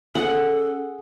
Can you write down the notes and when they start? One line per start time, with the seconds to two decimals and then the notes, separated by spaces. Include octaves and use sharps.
0.15 C#4 G#4 A4 F#5